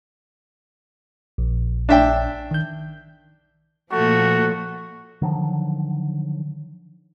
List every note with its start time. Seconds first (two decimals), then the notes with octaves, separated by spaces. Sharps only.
1.38 A#1
1.89 D4 E5 G5
2.51 D#3 G6
3.92 A#2 F3 A3 F#4
5.22 D3 D#3 F3 F#3